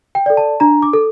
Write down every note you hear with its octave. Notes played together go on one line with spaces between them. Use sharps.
G5
A4 D5
A5
D4 A#5
D6
A4